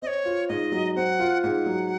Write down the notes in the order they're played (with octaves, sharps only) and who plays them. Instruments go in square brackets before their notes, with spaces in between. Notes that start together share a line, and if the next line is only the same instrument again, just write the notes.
[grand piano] C4 [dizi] D#5
[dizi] C#5
[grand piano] F4
[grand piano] G#2 [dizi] D#5
[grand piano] F#3
[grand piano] C4 [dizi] F#5
[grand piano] F4
[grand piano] G#2 [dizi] F#5
[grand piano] F#3